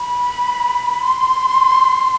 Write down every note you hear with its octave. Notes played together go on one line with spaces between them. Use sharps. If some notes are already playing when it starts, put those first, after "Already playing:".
Already playing: B5
C6